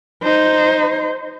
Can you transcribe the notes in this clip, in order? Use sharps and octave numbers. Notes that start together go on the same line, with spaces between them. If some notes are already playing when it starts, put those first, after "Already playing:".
D#4 C5